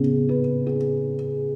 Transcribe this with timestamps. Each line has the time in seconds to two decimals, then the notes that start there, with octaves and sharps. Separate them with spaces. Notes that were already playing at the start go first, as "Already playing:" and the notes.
Already playing: C#3 B3
0.29 B4
0.67 G#4